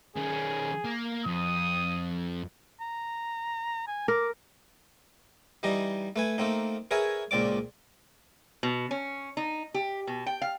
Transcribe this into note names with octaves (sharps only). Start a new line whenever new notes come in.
D#3 C#4 G#4
A#3
F2 D#6
A#5
G#5
A#4 D6
E3 G3 D#4 D#5
A3 B4 G#5
A3 A#3 C4 D#4
G#4 A#4 B4 C#5 E5 G#5
C#2 A#2 C4 D5 D6
B2
C#4
D#4
G4
B2
G5
F5